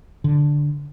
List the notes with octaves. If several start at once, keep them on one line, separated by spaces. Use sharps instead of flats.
D3